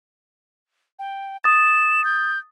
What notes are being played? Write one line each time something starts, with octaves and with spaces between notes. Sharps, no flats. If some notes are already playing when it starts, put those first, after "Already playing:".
G5
D#6 A6 E7
G6